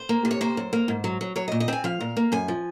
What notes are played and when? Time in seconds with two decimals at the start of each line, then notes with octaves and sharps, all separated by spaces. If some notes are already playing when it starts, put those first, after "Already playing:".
Already playing: C5
0.09 A#3
0.25 C3
0.31 C#5
0.41 A#3 C5
0.57 F#2
0.73 A#3
0.88 G#2
1.04 F#3
1.21 F#3
1.36 F#3 C#5
1.48 D#5
1.52 A#2
1.60 D#5
1.68 C4 G#5
1.84 F3 F5
2.00 A#2
2.17 A#3
2.32 F#2 G#5
2.48 F3